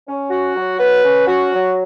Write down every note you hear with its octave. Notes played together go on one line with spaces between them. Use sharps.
C#4
F#4
F#3
B4
C#4
F#4
F#3